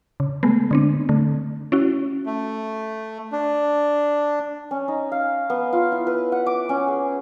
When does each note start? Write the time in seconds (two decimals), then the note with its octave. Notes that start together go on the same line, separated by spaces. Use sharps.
0.20 C#3
0.43 G#3 A3 B3
0.71 D3 C4 D4
1.09 D3 A3
1.72 C#4 E4 F#4
2.25 A3
3.32 D4
4.71 C#4
4.88 D#4
5.12 F5
5.50 B3
5.73 F4
5.92 E4
6.07 B4
6.32 F#5
6.46 D6
6.69 C#4
6.88 G#4